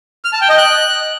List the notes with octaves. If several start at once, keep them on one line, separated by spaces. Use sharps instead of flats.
F6
A5
G5
D#5
F#6